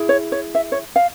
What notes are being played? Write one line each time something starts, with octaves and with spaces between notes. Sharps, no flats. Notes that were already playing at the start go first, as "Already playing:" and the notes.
Already playing: E4 G#4
C#5
C#5
E5
C#5
F5